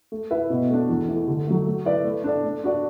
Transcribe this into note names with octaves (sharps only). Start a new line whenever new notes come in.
A3
E4 B4 E5
B2
A3 D4
E2
E3 A3
D3
F#3 A3
A3
E4 B4 D5
A3
D4 A4 D5
A3
D4 F#4 D5